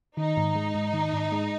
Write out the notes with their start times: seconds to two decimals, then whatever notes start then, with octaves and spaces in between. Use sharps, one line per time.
0.17 D#3 D#4
0.37 G#2
0.56 G#3
0.75 G#2
0.93 D#3
1.13 G#2
1.32 G#3